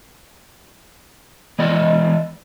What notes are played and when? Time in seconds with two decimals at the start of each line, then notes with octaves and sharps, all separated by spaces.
1.59 E3 G#3 D5 D#5